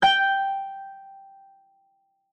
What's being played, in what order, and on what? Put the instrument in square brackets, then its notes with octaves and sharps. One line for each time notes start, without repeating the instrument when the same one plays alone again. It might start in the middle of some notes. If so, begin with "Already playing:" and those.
[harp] G5 G6